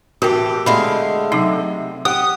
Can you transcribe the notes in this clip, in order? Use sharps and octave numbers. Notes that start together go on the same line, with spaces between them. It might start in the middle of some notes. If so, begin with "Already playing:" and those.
A2 E3 F#4 G4 A#4
D3 G#3 A3 F5 B5
C3 F#3 D#4
G4 F#5 D#6